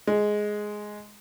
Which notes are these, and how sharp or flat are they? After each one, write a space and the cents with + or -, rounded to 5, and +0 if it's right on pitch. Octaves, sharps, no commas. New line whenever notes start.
G#3 +5